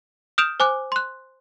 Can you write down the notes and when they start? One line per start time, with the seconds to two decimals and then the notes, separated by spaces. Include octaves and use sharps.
0.38 D#6 F6 G6 D7 E7 F7
0.60 C5 G#5 D6 F#6
0.92 C6 F#6